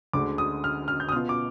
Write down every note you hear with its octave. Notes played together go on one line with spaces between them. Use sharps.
D2 D3 G#3 D6
D#6
F6
F6
G6
D#6
B2 B3 F4 F6
D6